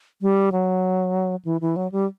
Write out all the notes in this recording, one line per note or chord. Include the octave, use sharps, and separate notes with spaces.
G3
F#3
E3
E3
F#3
G3